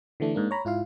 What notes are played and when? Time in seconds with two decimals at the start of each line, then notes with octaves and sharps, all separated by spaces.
0.20 D3 E3 A3 D4
0.34 G#2 A#3 D4
0.51 C#5 A#5 B5
0.65 G#2 E4 F4 F5